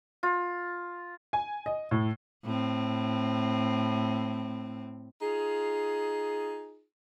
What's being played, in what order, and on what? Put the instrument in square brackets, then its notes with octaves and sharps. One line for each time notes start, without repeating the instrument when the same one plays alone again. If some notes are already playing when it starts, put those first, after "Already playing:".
[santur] F4
[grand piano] G#5
D#5
A2
[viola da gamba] A2 C4
[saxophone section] D#4 F4 G#4